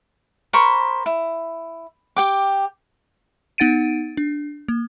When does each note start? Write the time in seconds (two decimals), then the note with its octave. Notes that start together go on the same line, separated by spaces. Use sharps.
0.53 A#4 C5 B5 C#6
1.06 E4
2.17 G4 G5 D6
3.58 B3 D#4 F#5 A6 D7 D#7
4.17 D4
4.68 A#3